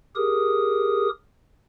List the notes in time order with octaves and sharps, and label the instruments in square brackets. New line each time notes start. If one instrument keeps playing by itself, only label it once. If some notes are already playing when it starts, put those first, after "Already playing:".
[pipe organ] G4 G#4 A#4 D#6